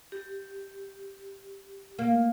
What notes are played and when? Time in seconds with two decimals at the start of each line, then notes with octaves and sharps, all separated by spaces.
0.12 G4
1.99 A#3